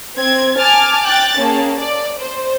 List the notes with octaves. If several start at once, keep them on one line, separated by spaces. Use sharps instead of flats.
C4 G#6
G#5 A5 D6 F6 A6
G5 F#6 A6
A#3 C#4 G#4 A5
D5
C5